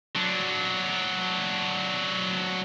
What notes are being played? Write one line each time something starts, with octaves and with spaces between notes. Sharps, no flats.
F#3 D4